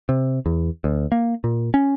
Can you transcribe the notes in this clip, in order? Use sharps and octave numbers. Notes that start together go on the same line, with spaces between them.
C3
E2
D2
A#3
A#2
C#4